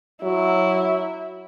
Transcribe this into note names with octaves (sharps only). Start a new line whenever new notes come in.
F#3 E4